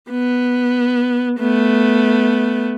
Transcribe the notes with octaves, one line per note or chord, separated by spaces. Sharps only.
B3
A3 B3